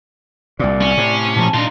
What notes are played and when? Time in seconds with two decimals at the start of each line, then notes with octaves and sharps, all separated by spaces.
0.59 C2 A#2 D5
0.81 C#4
0.97 A2 C3
1.36 A#2 F3 A5 A#5
1.54 A#2 D4 D#4 F4